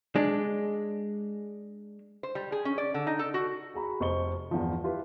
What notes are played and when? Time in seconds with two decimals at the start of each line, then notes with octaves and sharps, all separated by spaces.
0.16 G#3 D4
2.23 C5
2.35 G3
2.52 G#4
2.65 C#4
2.78 D5
2.94 D3
3.07 D#4
3.19 A4
3.34 F#4
3.74 F#4 G#4 A#5 B5
4.00 F1 C5 D#5 C#6 G7
4.51 E2 G2 E3 F3
4.84 E4 F4 G4 B4